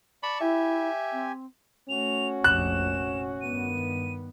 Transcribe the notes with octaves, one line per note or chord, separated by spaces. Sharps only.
D5 A5 B5 C#6
E4 G4 E5 G#5
C4
A3 C#4 F#4 F7
F1 A#1 F2 F#6 E7
G2 D#3 B3 D#7